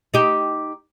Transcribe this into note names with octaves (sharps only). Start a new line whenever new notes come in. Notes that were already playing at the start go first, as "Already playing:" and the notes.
D#4 G4